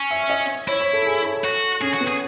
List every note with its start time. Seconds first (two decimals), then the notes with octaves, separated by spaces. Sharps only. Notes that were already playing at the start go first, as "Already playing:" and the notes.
Already playing: C#4
0.11 E5
0.30 D#5
0.68 E4 C#5
0.81 C#5
0.93 A4
1.06 G#4
1.24 A4
1.44 F#4
1.82 C#4 G#4
1.94 F#4
2.01 B3
2.08 G#4